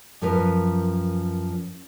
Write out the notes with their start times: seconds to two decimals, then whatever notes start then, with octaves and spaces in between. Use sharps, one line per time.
0.22 F#2 F3 C#4 A#4 B4